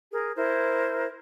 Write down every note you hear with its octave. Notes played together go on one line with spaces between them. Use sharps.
G#4 A#4
E4 A#4 C5